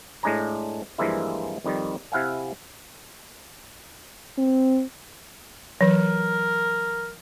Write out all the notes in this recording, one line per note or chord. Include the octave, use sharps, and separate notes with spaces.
A2 G#3 D4 G#5 A#5
G2 E3 F3 G#3 A#3 E4
F2 D#3 G3
C3 E4 F5 F#5 G#5
C4
E3 F#3 A#4